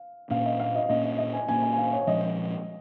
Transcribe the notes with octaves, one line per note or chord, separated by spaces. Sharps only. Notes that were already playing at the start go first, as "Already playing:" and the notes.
Already playing: F5
A#2 A#3 C#4 F5
D#5
F5
D#5
A#2 A#3 C#4 D#5
D#5
D#5
G#5
A#2 A#3 C#4 G#5
G#5
G#5
F5
C#5
A#2 F3 G#3 C#4 D#5